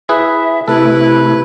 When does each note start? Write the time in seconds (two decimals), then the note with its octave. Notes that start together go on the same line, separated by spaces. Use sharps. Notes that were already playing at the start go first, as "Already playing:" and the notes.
0.09 E4 G#4 B4 E5
0.68 C3 A3 E4 A4 B4